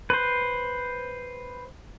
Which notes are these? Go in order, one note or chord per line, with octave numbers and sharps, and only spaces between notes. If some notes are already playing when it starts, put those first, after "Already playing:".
B4 C5